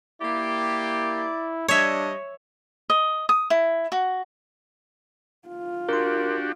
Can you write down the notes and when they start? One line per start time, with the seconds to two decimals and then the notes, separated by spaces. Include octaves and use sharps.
0.22 A#3 E4 G4 D5
1.68 G3 D4 C#5 D#5 E5
2.90 D#5
3.29 D#6
3.50 E4
3.92 F#4
5.48 F4
5.89 D4 F#4 G4 A#4 C6